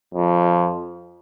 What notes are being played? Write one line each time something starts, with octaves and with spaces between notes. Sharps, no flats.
F2